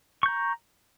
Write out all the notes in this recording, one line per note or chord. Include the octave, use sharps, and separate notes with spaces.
A#5 C#6 G6